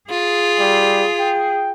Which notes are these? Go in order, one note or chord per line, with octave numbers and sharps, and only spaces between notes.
F4 G#4
G3
G5